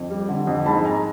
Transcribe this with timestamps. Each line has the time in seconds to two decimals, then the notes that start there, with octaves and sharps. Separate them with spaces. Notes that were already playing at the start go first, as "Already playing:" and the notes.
Already playing: F2
0.10 G3
0.29 D3
0.47 F2
0.66 G#2 A5 B5
0.85 G#3 G#5 A#5